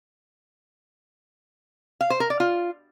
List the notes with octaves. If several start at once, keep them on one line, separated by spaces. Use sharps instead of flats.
F5
C5
A#4
D5
F4